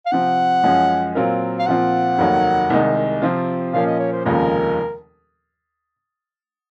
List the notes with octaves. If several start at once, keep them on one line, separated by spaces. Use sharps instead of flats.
F5
C3 F3 C4 F#5
F#2 F3 G#3 C#4 G#4
A#2 F#3 C4 F4 A#4
F5
A#2 F3 C4 F4 F#5
F1 D#2 D#3 F#3
C2 C3 D#3 G#3 D#4
C3 F3 C4 F4
A#2 F3 A#3 C#4 F5
D#5
C#5
C5
F1 D#2 C#3 F3 G#3 A#4